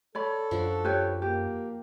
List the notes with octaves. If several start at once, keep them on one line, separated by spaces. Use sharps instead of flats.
A4 C#5 D5 B5
F#2 F3 D4 F#4
G4 B4 C#5
A#3 G4